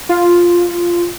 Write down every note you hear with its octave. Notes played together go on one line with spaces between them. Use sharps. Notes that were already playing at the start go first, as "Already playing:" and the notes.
F4